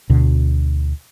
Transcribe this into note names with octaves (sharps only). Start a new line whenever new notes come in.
D2 B2 D3